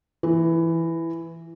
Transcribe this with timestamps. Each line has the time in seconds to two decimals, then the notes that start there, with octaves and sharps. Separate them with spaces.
0.23 E3